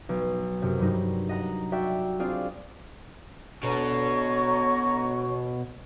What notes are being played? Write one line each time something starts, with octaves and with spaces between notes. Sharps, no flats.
B1
F#2 C3
G2 F#3 G3 D#4
D#5 F#5 A#5
F#4 D5 E5 G5
C4 D4 F4 G#4 D5
B2 D3 C#5 A#5 C#6